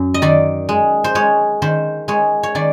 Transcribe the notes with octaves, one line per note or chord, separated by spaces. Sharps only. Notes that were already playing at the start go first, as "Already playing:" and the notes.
Already playing: F#2
D#5
D#3 D5
G#3
C5
G#3 C#5
D#3 C5
G#3 C#5
C#5
D#3 D5